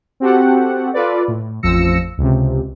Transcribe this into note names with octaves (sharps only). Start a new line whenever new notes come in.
C4 F#4 G4 A4 F#5
F4 A4 B4 D5
A2
A1 F2 F3 E6 A#6 C#7
C#2 C3